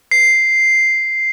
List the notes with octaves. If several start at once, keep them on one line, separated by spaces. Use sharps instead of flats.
C7